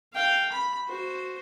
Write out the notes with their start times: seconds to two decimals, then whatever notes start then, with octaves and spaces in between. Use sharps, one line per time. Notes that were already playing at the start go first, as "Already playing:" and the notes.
0.14 F5 G5
0.52 B5
0.87 F#4 C5